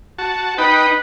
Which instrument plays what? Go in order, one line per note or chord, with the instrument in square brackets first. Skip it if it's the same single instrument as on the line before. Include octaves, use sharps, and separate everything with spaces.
[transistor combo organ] F#4 A5
[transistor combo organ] D#4 G5 B5 [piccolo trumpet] B4